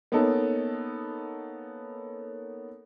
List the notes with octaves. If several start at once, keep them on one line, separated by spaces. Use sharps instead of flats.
A#3 B3 C#4 D#4 A4